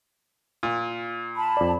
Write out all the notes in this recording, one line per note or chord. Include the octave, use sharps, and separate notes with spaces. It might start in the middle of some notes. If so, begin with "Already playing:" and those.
A#2
A5 B5
F2 D5